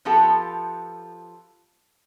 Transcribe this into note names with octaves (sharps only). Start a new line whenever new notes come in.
F3 B3 F4 G4 A4